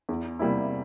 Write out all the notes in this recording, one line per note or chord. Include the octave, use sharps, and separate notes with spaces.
E2
C3 G3 A#3 E4